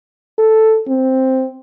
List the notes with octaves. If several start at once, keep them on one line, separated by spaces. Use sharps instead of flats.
A4
C4